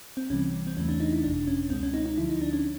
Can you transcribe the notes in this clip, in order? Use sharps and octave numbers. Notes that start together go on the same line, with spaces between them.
C4
C2 C3 E3 G3 C#4
C4
E2 C#3 E3 A3 C#4
D4
D#4
E4
G1 F2 C3 D4
C#4
C#2 B2 G#3 C4
C#4
D#4
D#4
D2 D3 F3 E4
D#4
D4
C#4